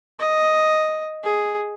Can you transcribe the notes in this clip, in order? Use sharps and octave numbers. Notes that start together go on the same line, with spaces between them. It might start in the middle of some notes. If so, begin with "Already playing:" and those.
D#5
G#4